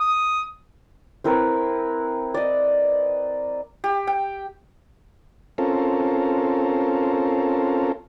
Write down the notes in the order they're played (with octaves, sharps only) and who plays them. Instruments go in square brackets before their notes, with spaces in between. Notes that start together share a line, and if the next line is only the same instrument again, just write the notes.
[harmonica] D#6
[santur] C4 E4 A#4 B4
D5 D#5
G4
G5
[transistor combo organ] C4 C#4 F4 A4 A#4